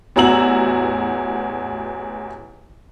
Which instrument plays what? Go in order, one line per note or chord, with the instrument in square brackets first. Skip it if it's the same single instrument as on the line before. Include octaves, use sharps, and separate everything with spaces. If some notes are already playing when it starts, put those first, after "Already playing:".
[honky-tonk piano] A1 E2 F#4 A#5 E6 F#7